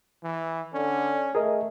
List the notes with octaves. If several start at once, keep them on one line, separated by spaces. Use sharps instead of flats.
E3
D3 C#4
A3 G#4 A#4 D#5